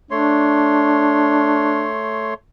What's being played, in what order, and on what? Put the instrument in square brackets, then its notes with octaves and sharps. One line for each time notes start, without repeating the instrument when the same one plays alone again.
[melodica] A3 C#5 C6 [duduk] D4